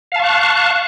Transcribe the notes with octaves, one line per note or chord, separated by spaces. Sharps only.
F5 A5 C#6 F#6